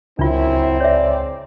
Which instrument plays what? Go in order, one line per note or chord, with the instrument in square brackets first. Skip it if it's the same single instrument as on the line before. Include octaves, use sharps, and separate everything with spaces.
[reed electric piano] C#2 [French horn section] F#2 E4 [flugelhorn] C4 [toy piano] D4 F4
[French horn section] G#2 D5 [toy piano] C#5 E5